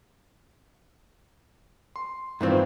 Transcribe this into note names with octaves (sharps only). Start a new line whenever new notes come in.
C6
G2 D#3 E3 C4 E4 F4